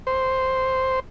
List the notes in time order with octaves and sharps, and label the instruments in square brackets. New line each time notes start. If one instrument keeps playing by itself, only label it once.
[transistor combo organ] C5